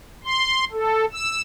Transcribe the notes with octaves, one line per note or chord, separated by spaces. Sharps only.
C6
A4
E6